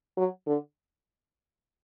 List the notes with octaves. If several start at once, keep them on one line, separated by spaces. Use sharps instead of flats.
F#3
D3